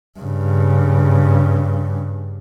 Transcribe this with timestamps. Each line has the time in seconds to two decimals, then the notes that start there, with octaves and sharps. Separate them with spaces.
0.19 G2 C#3